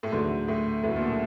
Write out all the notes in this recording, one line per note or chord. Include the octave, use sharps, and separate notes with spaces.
A2
D2 G#2 D3 F#3 B3 E4
A2
D2 A2 D3 F#3 B3 E4
A#2
B2